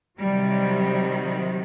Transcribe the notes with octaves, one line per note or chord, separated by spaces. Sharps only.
C3 D#3 F#3 G3